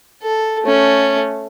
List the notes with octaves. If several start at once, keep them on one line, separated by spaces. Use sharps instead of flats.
A4
A3 C#4